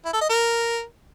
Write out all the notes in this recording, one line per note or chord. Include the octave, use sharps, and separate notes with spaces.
E4
A4
D#5
A#4